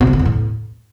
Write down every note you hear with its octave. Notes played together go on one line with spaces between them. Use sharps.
B2
C3
D3
E2
A2